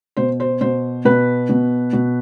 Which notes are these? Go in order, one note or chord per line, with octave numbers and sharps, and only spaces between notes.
B2 C5
C5
B2 C5
B2 B4
B2
B2